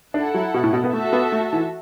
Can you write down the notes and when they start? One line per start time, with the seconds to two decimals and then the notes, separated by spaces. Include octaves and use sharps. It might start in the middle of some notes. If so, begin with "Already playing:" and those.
0.14 D4 E4 A4 F#5
0.34 F#3
0.54 B2
0.64 A2
0.73 B2
0.84 B3
0.93 A3 F#4 A4 E5 A5
1.13 B3
1.32 A3
1.53 E3